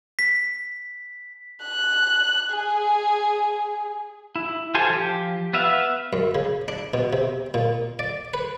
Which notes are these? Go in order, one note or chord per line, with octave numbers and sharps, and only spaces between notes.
B6
F#6
G#4
E4
F4 G4 A4 C5 G#5
F3 G4
B3 B4 E5 F5
F#2
C#3
D4
B2
C3
A#2
D5
B4